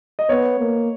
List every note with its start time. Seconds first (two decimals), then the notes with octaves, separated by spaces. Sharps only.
0.19 D#5
0.29 B3 C#5
0.59 A#3